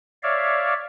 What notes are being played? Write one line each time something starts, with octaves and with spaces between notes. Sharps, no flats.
C#5 D5 E5 F5